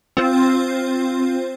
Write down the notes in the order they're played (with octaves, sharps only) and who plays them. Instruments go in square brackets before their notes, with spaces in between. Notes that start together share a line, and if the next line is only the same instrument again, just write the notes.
[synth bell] C4 F4 C5